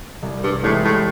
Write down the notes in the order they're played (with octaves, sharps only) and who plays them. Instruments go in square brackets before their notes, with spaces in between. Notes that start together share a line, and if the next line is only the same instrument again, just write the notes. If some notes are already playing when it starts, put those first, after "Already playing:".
[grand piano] C2
[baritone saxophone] G2
[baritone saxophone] A2 [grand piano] C3 E3 G#3
[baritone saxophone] A2